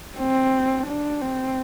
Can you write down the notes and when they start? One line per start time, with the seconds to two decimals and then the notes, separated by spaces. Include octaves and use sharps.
0.18 C4
0.87 D4
1.21 C4